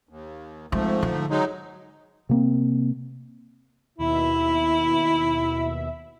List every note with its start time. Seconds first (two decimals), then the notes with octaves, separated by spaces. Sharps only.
0.09 D#2
0.72 G#2 F3 G#3 A3 C4
1.02 D3
1.30 F#3 G#3 D#4
2.29 C3 A#3 C4
3.98 D#2 B2 E4 E5